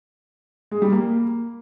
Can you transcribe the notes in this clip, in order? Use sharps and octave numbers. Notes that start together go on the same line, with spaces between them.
G#3
G3
A#3